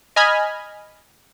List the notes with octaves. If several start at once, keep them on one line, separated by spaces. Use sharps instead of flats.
D#5 G#5 B5 F6 G#6